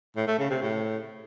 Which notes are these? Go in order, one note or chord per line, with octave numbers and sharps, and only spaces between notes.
A2
A3
C#3
C3
A2